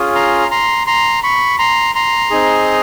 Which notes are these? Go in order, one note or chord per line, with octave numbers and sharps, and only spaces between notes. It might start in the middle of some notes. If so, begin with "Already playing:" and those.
Already playing: C#4 F4 G#4
A#5 C6
A#5 C6
A#5 C6
B5 C#6
A#5 C6
A#5 C6
C4 D#4 G#4